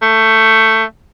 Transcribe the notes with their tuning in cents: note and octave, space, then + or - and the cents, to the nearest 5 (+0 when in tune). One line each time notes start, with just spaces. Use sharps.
A3 +15